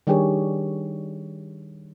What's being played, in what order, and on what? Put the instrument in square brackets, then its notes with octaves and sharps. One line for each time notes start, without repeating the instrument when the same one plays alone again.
[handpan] D#3 G3 D4 G4 G#4 C#5